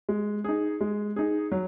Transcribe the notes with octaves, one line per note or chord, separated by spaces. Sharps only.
G#3
D#4 G#4
G#3
D#4 G#4
F#3